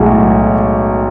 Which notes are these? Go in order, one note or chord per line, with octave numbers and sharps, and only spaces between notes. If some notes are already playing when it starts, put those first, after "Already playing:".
Already playing: B1 A2 G#3 F#4